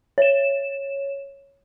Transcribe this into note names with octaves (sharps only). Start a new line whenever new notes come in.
C#5 E7